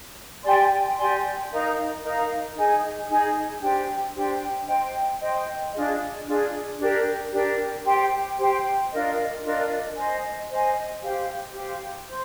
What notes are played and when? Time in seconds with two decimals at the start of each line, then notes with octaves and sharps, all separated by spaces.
0.43 G4 D5 G#5 C6
0.97 G4 D5 G#5 C6
1.50 D#4 A#4 F5 A#5
2.02 D#4 A#4 F5 A#5
2.55 D#4 G#4 D#5 G#5
3.09 D#4 G#4 D#5 G#5
3.61 D4 G4 C5 G5
4.14 D4 G4 C5 G5
4.67 C5 D#5 G5
5.21 C5 D#5 G5
5.72 D4 F4 G#4 D#5
6.26 D4 F4 G#4 D#5
6.78 D4 G4 A#4
7.32 D4 G4 A#4
7.84 G4 C5 G5 C6
8.37 G4 C5 G5 C6
8.91 D4 F4 A#4 D#5
9.43 D4 F4 A#4 D#5
9.97 C5 D#5 G#5
10.50 C5 D#5 G#5
11.02 G4 C5 F5
11.55 G4 C5 F5
12.09 C5